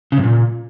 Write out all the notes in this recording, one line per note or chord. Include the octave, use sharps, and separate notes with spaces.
C#3
G2
A#2